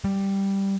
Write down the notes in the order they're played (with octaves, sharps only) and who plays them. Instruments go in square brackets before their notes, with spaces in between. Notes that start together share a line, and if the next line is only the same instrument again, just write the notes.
[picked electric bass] G3